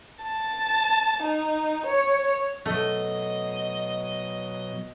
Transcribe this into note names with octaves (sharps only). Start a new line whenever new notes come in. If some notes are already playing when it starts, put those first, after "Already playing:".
A5
D#4
C#5
B2 F#3 A3 D#5